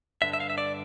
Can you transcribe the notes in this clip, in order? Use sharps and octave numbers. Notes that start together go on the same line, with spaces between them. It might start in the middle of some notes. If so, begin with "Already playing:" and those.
G2 D3 E5
E5
F5
E5
D5